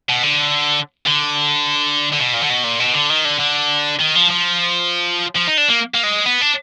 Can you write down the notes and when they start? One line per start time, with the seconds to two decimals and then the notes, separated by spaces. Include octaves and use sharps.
0.09 B2
0.23 D3
1.07 D3
2.13 D3
2.20 B2
2.34 A#2
2.43 D3
2.50 B2
2.64 A#2
2.80 B2
2.94 D3
3.10 D#3
3.25 D3
3.40 D3
3.99 D#3
4.15 F3
4.30 F3
5.36 F3
5.47 D#4
5.58 D4
5.69 A#3
5.94 A#3
6.03 G#3
6.26 B3
6.41 D4